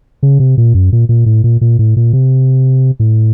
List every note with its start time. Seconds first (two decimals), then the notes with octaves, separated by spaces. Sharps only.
0.23 C#3
0.40 C3
0.58 A#2
0.74 F#2
0.92 A#2
1.09 A#2
1.26 A2
1.44 A#2
1.61 A#2
1.79 A2
1.97 A#2
2.13 C3
3.00 A2